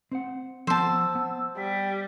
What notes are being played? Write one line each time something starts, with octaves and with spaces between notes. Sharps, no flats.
C4 C5 F#5
F3 B3 C5 A5 E6
B3
G3 B6